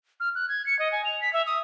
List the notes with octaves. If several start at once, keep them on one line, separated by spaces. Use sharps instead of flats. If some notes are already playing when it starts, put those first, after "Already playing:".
F6
F#6
G#6
C#7
D#5
G#5
F7
B6
E5
D#6